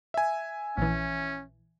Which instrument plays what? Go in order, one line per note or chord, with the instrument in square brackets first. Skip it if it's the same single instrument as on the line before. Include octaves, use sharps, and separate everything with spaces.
[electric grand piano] E5 G#5
[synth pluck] A#1 E3 [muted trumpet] C#4